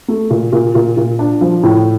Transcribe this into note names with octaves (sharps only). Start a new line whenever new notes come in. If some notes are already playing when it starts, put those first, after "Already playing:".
A3
A#2
A#2
A#2
A#2
D4
F3
A2